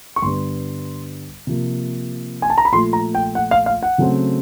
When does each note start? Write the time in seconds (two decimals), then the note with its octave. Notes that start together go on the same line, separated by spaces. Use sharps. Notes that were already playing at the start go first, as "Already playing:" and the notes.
0.16 C#6
0.22 G2 D3 G3 B3 C6
1.47 C3 F3 A#3
2.42 G#5
2.50 A5
2.58 A#5
2.65 B5
2.72 A#2 F3 A3 C6
2.93 A#5
3.15 G5
3.35 F#5
3.51 F5
3.66 F5
3.83 F#5
3.98 C#3 F#3 A3 C4